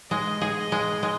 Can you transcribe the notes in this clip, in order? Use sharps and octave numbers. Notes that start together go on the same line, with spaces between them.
G#3 D#5
G#4
D#5
G#3
G#3